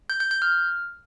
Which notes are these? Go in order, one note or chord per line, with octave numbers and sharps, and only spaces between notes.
G6
G6
G6
F6